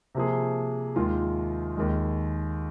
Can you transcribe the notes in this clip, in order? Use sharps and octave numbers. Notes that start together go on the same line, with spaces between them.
C3 F3 A#3 G#4
D#2 D#3 G#3 F4
D#2 D#3 G#3